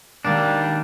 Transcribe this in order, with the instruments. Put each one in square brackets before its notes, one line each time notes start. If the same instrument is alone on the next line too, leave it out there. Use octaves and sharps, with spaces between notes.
[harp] B2 D#3 G#3 [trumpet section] G3 A#3 [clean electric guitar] D4